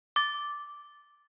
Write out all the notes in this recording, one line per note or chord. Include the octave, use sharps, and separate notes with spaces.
D6 A6